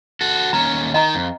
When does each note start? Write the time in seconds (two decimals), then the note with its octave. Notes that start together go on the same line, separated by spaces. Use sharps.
0.21 F#4 A4
0.53 D#2 C#4 A#5
0.94 D#3 D#5 A#5
1.15 F2